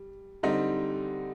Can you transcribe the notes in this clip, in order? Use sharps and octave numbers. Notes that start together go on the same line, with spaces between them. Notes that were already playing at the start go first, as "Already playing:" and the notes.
Already playing: G3
D3 G3 C4 D#4